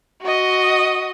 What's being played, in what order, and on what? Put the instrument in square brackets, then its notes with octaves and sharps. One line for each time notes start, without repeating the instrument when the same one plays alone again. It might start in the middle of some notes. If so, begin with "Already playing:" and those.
[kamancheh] F#4 D#5